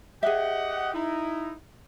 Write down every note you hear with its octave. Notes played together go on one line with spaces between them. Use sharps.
G4 G#4 D#5 E5 F#5
D#4 E4